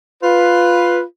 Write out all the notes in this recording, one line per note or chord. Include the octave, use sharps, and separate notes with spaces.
F4 B4